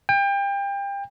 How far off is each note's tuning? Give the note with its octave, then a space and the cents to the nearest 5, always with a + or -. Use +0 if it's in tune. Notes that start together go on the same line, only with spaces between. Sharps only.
G5 +30